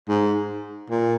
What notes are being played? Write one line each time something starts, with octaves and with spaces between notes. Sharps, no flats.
G#2
A#2